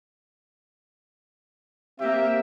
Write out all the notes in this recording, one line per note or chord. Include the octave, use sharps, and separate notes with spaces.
A#3 C4 G4 E5